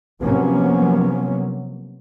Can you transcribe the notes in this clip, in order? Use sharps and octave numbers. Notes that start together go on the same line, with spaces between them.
C3 F3 F#3 A#3 B3 C#4